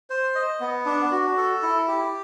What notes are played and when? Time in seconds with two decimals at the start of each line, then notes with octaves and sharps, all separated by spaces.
0.10 C5
0.35 D#5
0.60 B3
0.86 D4
1.12 F#4
1.37 A4
1.63 E4
1.88 G4